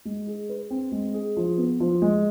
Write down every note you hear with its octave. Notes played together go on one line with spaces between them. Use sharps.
G#3
G#4
B4
C4
G#3
G#4
F3
B3
F3
G#3